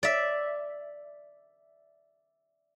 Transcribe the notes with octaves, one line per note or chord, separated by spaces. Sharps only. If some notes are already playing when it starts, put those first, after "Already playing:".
D5 E5